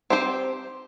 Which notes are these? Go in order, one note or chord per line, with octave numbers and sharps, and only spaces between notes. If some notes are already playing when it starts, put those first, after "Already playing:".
C4 G4 C5